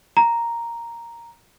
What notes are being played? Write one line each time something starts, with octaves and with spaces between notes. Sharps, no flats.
A#5